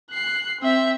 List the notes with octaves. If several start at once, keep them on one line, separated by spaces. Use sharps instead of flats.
F#6 C7
C4 E5